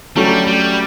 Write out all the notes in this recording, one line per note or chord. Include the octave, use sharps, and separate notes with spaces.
F#3 G3 A3 C#4
G3